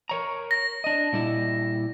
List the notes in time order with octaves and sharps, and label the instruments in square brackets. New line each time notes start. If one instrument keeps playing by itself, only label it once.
[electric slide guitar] A#4 C#5 A#5
[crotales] A#6
[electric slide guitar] D4 D#5
A#2 G3 E4